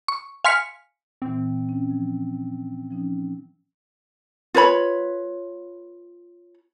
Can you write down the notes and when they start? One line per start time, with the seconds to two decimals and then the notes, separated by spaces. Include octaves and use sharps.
0.08 C#6
0.44 F5 G#5 C6 F6 B6 C#7
1.22 A#2 E3 C4
1.69 C#4
1.91 F3
2.91 F3 C#4 D#4
4.54 F4 B4 C#5 B5